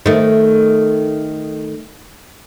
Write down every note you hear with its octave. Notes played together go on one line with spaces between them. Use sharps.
D#3 A3